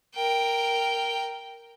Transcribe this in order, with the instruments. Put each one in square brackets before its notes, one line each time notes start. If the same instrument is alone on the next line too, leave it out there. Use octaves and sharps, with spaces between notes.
[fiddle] A#4 G5